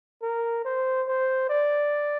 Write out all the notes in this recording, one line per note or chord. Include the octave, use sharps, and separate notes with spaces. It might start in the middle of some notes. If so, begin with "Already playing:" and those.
A#4
C5
C5
D5